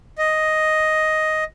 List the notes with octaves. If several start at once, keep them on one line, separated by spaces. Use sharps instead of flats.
D#5